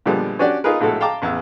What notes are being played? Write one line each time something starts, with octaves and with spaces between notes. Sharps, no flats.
A#2 D3 F3 G3 G#3 B3
C#4 D4 F#4 G4 D5
D#4 F4 G#4 A#4 B4
A#1 A2 G#3 F#4 A4
F5 G5 A5 A#5 D6
A1 E2 G#4 E6